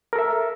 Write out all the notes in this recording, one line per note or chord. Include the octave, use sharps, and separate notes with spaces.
A4 A#4 E5